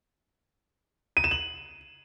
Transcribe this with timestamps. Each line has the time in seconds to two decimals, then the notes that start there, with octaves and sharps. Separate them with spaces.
1.17 D#7
1.24 E7
1.31 F#7